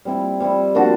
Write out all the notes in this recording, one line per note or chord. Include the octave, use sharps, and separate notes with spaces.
G3 C4 E4
G3 C4 E4
F3 A#3 D4 F#4